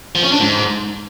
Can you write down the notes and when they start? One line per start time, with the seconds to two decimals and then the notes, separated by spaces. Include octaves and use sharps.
0.15 F3
0.23 C#4
0.32 D4
0.40 G#2